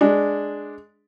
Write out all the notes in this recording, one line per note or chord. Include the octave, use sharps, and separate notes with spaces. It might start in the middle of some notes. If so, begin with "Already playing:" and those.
G#3 D4